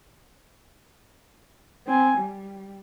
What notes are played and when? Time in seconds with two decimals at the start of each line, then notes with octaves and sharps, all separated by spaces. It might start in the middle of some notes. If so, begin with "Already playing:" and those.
1.87 C4 G#5
2.17 G3